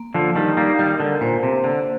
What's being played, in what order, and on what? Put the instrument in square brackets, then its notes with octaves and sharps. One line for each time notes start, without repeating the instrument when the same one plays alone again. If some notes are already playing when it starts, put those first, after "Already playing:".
Already playing: [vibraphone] A#3
[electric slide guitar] D3 F3
[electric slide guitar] D#3 G3 [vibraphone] D#4
[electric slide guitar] G3 A#3
[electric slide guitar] D#3 G3 [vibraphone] A#4
[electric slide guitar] D3
[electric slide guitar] A#2 [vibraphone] C5
[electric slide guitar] C3
[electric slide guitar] D3 [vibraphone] A#3